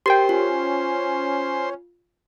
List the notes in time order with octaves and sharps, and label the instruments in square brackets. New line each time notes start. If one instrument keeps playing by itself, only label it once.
[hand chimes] G4 A#4 [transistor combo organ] C5 [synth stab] G5 C6
[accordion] C#4 [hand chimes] F4